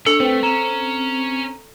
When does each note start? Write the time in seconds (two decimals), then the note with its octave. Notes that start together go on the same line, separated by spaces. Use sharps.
0.06 D4 A4 C#5 C#7
0.20 A3 C4 B4 G5
0.43 C#4 A#5 E7